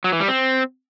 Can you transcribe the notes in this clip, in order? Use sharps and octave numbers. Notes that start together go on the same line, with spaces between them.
F#3
E3
G3
C4